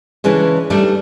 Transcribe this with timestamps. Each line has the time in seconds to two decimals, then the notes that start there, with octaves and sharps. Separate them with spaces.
0.24 C#3 E3 G#3 C#4 D4
0.70 G3 A3 D4 D#4 A4 D5